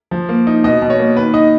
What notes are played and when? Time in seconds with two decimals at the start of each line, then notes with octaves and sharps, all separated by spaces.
0.11 F3
0.29 A#3
0.47 D#4
0.64 B2 D#5
0.82 B2
0.90 C#5
0.99 A#3
1.16 D#3 B4
1.34 D#4 D#5